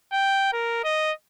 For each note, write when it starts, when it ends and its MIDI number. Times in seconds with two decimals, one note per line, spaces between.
0.13 0.49 79
0.53 0.82 70
0.84 1.11 75